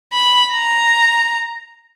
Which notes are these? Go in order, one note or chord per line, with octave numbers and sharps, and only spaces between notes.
B5
A#5